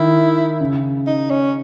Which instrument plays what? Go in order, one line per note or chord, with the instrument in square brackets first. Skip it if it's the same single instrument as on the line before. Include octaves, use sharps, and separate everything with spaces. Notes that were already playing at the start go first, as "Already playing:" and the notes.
Already playing: [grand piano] D#3 [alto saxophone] E4
[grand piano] C#3
[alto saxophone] D#4
C#4